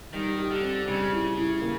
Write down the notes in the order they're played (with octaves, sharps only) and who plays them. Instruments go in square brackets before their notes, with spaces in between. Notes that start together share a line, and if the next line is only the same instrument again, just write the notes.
[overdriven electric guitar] D#3 [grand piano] G3
[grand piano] G4
[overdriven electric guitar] D3
[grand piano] C4
[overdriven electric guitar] C#3 [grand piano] G3
[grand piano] E4
E4
A#3